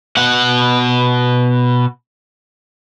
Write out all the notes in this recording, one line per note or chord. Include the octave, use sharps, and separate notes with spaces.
B2 F#5